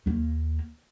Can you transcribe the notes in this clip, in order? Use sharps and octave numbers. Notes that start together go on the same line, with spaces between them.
D#2 A#3